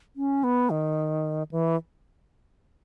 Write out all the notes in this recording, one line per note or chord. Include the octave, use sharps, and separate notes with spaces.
C#4
B3
D#3
E3